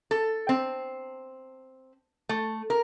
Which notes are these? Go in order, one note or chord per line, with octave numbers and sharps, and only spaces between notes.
A4
C4
A3
A#4